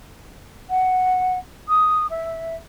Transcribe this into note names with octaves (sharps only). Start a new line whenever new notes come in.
F#5
D#6
E5